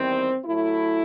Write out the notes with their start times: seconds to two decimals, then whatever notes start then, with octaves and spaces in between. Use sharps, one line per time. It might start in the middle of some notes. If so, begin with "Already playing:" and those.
Already playing: E2 D#3 G3 C4
0.46 A2 F#3 A3 E4